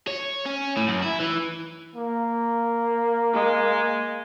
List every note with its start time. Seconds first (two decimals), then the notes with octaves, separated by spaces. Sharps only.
0.08 C#5
0.46 C#4
0.77 A2
0.88 F#2
1.02 E4
1.19 E3
1.96 A#3
3.34 G#3